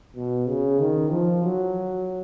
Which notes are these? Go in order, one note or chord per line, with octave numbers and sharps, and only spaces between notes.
B2
C#3
D#3
F3
F#3